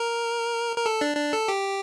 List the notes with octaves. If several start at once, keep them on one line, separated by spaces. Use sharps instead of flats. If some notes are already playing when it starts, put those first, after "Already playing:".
Already playing: A#4
A#4
A4
D4
D4
A4
G4